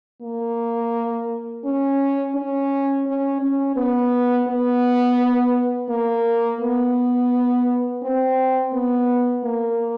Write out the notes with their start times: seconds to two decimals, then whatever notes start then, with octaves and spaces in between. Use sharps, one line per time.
0.22 A#3
1.64 C#4
2.35 C#4
3.06 C#4
3.41 C#4
3.76 B3
4.48 B3
5.89 A#3
6.61 B3
8.02 C4
8.73 B3
9.45 A#3